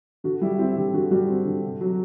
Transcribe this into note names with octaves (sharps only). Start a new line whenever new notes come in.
D3 F#4
G3 E4
C4 E4
D3 G4
D3 F#4
G3 F#4
C4
D3
C3
F#3